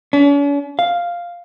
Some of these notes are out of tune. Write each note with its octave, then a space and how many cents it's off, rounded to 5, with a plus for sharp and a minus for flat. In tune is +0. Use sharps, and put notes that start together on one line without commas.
C#4 +45
F5 +0